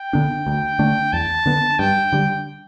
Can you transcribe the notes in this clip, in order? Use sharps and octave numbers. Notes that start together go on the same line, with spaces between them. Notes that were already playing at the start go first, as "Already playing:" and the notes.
Already playing: G5
D3 B3 D4
D2
D3 A3 D4
E2 A5
D3 B3
G2 G5
D3 G3